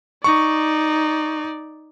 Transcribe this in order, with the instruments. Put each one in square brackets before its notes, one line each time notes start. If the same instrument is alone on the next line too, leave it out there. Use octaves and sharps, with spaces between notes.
[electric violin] D#4 D5 [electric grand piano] C#6